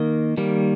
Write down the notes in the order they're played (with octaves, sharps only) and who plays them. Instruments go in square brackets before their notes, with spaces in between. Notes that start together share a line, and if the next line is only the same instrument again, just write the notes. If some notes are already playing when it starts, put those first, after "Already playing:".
Already playing: [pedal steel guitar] D#3 A#3 D#5
D#3 G3 A#3